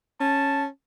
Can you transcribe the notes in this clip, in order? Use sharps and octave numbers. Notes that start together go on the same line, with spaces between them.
C#4 A5